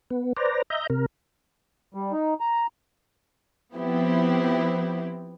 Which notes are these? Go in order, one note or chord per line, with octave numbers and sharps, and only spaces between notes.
B3
B4 C5 D5 A#5
D#5 E5 A#5 G6
C3 A#4
G3
D#4
A#5
F3 B3 C4 E4 G4